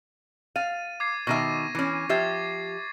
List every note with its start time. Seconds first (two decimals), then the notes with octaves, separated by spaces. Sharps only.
0.56 F5 A6 D#7
1.00 D6 G#6 C7
1.27 B2 D#3 E5 C#6 A#6 D#7
1.75 E3 C#4
2.09 F3 G4 E5 G#6 A6 C7